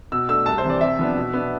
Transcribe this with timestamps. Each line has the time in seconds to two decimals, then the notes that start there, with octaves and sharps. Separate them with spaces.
0.12 B2 E6
0.29 A3 D4 E6
0.46 C2 A5
0.58 C5
0.64 C3 E3
0.70 D5
0.81 C3 E5
0.99 F3 B3 D4
1.16 B2
1.33 B3 D4